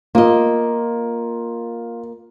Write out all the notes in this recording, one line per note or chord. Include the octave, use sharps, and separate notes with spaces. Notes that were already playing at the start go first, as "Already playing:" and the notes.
A#3 F4 D#5